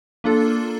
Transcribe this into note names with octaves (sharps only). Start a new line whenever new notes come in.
A#3 D4 F4 A4